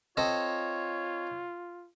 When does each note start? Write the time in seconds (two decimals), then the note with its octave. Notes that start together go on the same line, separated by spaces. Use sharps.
0.17 C4 F4 A4 C#5 D#5